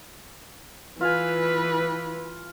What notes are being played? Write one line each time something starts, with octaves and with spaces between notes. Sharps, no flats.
E3 F4 B4 F5 G#5